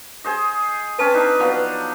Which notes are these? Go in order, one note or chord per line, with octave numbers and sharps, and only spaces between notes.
G#4 C5 D#5
C4 C#4 B4 A5
D4 D#4
F3 F#3 B3